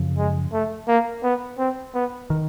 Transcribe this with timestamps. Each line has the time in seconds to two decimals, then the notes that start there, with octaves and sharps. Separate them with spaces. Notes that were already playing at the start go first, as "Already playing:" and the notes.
Already playing: F#2 C#3 F3
0.17 G#3
0.52 A3
0.88 A#3
1.23 B3
1.58 C4
1.94 B3
2.30 D#3